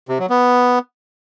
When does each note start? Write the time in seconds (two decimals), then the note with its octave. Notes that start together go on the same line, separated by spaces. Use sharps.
0.09 C3
0.19 F#3
0.30 B3